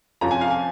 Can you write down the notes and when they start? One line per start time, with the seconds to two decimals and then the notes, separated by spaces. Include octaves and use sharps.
0.21 F1 F2 F3 C#4 F4 A#5
0.31 G#5
0.41 F5
0.50 G#5